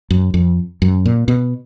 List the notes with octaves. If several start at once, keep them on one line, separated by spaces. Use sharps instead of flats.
F#2
F2
F#2
A#2
B2